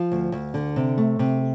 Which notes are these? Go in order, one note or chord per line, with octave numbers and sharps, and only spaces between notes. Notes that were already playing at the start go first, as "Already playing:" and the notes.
Already playing: F3 F5
D2
D2
D3
C3
A3
C3